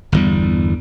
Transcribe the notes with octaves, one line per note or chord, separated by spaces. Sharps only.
G1 E2 G3